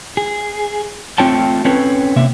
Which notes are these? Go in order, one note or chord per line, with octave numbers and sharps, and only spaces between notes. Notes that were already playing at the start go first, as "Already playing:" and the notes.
G#4
A3 C4 F4 C#5 G5 A5
C4 C#4 A4 B4 C#5
C3 A#3 E5